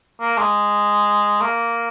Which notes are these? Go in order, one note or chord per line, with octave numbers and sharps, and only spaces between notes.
A#3
G#3
A#3